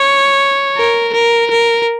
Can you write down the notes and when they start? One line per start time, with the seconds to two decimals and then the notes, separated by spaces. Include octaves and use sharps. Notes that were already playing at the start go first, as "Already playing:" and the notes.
Already playing: C#5
0.77 A#4
1.14 A#4
1.50 A#4